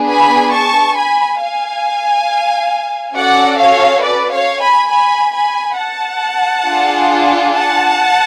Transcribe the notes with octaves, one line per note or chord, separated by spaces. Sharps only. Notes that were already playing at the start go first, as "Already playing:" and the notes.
Already playing: B3 D4 G#4
G#5 B5
A5 C#6
G#5 B5
F5 G#5
C#4 F#4 A4 D5 F#5
C#5 F5
B4 D5
C#5 F5
G#5 B5
G#5 B5
G#5 B5
F#5 A5
D4 F4 G#4
F#5 A5